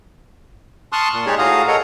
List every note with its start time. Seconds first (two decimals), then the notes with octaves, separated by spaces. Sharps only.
0.92 A5 C6 C#6 D#6 F6 F#6
1.13 A#2
1.26 G#3 D#4 G4 G#4 C#5 D5
1.38 A2 F#4 G#4 F5 A#5 D#6
1.68 A4 A#4 C#5 D#5 F#5 A#5